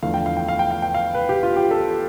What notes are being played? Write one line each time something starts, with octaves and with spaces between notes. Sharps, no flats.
E2 D3 F3 A3 F5
G5
F5
G5
F5
G5
F5
G5
F5
B4
G4
F4
G4
A4